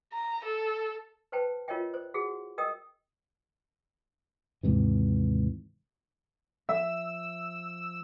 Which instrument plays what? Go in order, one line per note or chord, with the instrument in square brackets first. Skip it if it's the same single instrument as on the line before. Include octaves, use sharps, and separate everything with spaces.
[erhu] A#5
A4
[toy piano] B4 C5 G5 A5
F4 A#4 C#5 D#5 E5 G5
C5
F#4 G#4 F#5
A#4 D#5 G5 D#6 E6
[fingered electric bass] D#2 G#2 C3 E3
[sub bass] F3 [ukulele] E5 [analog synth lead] E6